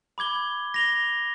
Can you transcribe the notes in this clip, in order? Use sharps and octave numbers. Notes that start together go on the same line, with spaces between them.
B5 D6 G#6 G7
A#6 F7 G7